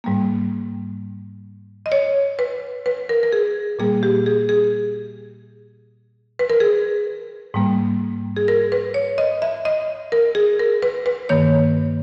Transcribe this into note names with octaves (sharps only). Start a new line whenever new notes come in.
G#2 G3 A#3
D#5
C#5
B4
B4
A#4
A#4
G#4
A#2 G3 A#3 G#4
G4
G#4
G#4
B4
A#4
G#4
G#2 G3 A#3
G#4
A#4
B4
C#5
D#5
E5
D#5
A#4
G#4
A#4
B4
B4
G2 D#3 A#3 C#5